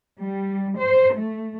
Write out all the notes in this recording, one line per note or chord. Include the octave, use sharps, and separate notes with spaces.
G3
C5
A3